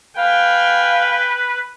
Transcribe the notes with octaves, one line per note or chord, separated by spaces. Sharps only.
B4 F5 G5 G#5